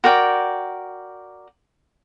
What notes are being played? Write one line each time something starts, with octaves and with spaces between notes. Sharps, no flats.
F#4 A#4 D5 G5